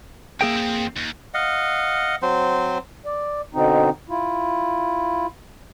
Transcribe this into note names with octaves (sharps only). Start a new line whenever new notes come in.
A#3 G#4 A#4 E5 G5
F2 C4
D#2
D#5 F5 F#5
F#3 C4 C5
D5
B2 D3 C4 D#4
E4 F4